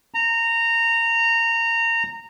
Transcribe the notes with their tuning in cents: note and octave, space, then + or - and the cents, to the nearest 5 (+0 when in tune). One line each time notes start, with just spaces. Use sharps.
A#5 -20